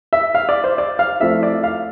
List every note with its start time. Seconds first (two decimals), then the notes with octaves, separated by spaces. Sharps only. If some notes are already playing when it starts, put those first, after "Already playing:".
0.13 E5
0.35 F5
0.49 D5
0.64 C5
0.78 D5
0.99 F5
1.20 F3 A3 C4 E4 E5
1.43 D5
1.63 F5